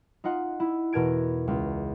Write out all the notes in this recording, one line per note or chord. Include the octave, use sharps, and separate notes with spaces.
D#4 F4 D#5 F#5
E4
E2 B2 A#4 A5 G#6 D7
C#2